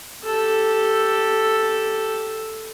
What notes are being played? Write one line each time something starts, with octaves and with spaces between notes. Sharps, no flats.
G4 A4